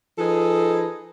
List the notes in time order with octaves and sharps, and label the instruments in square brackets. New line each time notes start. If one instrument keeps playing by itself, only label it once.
[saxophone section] F3 D#4 G#4 A4 B4